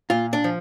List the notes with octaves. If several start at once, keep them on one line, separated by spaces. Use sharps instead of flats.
A#2 F4
D4
F3